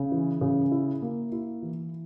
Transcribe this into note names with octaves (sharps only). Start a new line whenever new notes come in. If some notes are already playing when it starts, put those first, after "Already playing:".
Already playing: C#3
E3
C#3
E4
A#3
E4
E3